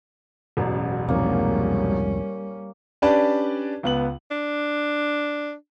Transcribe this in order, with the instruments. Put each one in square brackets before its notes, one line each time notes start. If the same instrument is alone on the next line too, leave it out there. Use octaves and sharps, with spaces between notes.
[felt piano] E1 A1 F#2
[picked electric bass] C2 F2 G#2 [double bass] G3 C#4 [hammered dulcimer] A#3
[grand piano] C#4 D4 G4 B4 D5 A5
C#2 B3 F#7
[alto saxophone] D4